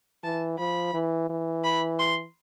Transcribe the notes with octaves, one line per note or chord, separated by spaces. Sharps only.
E3 A5
F3 B5
E3
E3
B5
C6